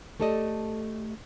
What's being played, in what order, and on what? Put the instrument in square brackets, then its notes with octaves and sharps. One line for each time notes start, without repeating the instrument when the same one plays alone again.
[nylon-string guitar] A3 G4 A4 D5 D#5